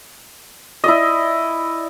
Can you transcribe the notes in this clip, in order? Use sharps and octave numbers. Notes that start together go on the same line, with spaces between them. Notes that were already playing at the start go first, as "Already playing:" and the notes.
E4 D5 D#5